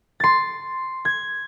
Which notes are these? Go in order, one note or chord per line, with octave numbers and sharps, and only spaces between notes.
C6 A6
G#6